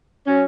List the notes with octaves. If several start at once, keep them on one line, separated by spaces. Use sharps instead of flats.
F#3 C#4